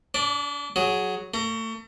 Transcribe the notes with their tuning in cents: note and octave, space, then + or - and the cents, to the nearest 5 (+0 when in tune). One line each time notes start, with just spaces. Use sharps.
D4 -35 D5 +0
F#3 +0 G#4 +15
A3 +35 A#5 +0